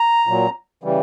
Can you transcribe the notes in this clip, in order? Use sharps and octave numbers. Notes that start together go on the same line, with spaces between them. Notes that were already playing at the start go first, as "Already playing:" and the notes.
Already playing: A#5
A#2 F#3
C#3 E3 G3